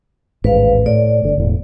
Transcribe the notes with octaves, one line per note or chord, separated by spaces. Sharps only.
A1 D#2 G#2 B4 F5
A2 D5
G1 D3
E1 A2